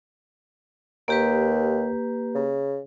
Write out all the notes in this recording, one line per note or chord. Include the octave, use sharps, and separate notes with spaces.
D#2 A#3 G4 B4
C#3